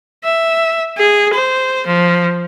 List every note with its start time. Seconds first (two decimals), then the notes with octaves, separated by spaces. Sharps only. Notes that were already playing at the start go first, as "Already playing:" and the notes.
0.25 E5
0.98 G#4
1.34 C5
1.87 F3